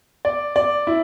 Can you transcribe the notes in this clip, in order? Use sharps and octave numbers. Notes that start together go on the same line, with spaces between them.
D5
D5
E4